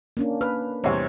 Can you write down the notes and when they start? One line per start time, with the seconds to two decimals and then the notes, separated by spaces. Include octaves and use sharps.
0.17 A#3 C#4 D4
0.41 B4 F6
0.84 E2 C3 G3 C5 C#5